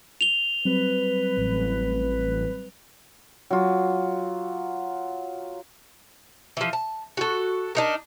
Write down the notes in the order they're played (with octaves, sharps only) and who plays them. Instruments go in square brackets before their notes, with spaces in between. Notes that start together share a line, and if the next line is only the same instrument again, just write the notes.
[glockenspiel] F7 G7
[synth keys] F#3 G3 C4 [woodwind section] B4
[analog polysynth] A1
[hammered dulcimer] F#3 F4
[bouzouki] E3 F3
A5
F#4 A4
D4 D#4 A#4